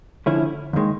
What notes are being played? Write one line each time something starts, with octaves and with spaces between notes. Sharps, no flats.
D3 F3 A3 C#4 E4
D#2 D#3 G#3